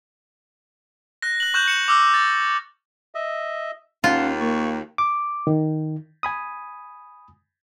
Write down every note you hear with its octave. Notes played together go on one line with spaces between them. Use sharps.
F#6 A#6
F#6 F#7
C#6 F#6 G6 E7 F#7
C#7 E7
D6 E6 F6
A6
D#5 E5
D#2 C#4 F4 F5 F#5 A5
A#3 C#6
D6
D#3
G#5 B5 D#6